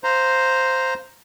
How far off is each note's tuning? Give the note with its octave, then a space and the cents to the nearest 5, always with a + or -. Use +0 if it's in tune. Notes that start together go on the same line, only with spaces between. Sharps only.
C5 +0 F5 +0 A#5 +0